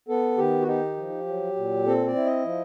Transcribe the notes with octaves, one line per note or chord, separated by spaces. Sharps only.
B3 A4
D#3 G4
F#4
D#4 G4
F3
F#3
A#2
C4 A4
D5
E4
D#5
F3